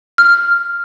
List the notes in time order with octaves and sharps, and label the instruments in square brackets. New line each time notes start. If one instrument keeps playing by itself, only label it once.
[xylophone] F6